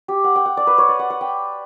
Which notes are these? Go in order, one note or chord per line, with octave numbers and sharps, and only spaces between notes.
G4
F#5
G5
F#5
D5
B4
C#5
D5
F#5
F#5
G5